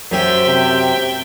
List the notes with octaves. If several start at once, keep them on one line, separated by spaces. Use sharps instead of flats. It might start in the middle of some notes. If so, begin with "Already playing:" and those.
F#2 G4 C5 E5 G5
C3